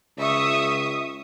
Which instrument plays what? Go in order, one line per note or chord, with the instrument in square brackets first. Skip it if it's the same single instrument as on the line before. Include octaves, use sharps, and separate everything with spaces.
[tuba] C#2 [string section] E5 C#6 D#6